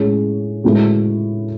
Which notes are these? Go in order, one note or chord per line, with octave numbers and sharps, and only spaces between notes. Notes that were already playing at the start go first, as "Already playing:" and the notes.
Already playing: A2 G#3 C#4 G#4
A2 G#3 B3 F#4